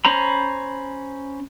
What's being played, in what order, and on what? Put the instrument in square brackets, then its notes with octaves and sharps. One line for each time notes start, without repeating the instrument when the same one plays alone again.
[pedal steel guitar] C#4 C5 A#5 B5